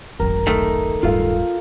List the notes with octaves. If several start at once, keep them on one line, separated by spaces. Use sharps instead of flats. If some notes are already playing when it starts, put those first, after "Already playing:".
D1 G#1 F#2 A#4
D#3 A3
D1 G2 F4 A4 F5